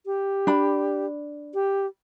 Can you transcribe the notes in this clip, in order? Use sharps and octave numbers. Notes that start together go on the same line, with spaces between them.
G4
D4 B5
G4